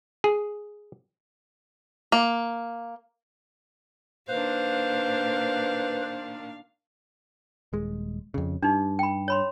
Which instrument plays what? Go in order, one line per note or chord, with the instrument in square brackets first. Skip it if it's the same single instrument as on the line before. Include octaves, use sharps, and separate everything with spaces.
[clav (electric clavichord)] G#4
[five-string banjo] A#3
[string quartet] A#2 D#3 D4 [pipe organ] B4 [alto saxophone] C5 [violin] F5
[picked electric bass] D#1 G#3
F2 C#3
[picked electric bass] G2 [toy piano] D4 D#4
[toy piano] G5 B5
C#5 B5 C6